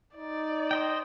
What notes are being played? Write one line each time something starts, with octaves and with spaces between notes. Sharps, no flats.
D#4 D5
C5 D#5 G5